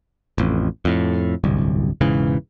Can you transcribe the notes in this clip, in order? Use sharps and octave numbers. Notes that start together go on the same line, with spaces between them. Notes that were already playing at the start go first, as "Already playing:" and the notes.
A1 F2
F2 A2
D1 G1 C2
E1 G#2 C#3 E3